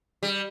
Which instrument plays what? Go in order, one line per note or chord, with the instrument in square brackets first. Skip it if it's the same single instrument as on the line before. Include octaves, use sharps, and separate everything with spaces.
[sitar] G3